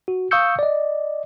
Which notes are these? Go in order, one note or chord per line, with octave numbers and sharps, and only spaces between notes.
F#4
F5 C#6 D#6 E6 G6 C#7
D5 D#5